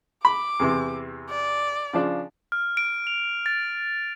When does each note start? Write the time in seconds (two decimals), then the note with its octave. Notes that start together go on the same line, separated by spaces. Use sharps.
0.25 B5 D6
0.60 E2 C3 E3
1.30 D5
1.93 C#3 F3 D4
2.52 F6
2.77 D7
3.07 F7
3.46 A6